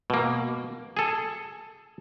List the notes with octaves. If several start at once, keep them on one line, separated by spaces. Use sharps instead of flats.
B2 A#3
G#4 A4